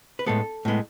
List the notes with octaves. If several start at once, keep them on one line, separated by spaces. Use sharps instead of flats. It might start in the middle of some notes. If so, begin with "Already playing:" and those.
B4
A2 G#3 B3 A4
A2 G#3 B3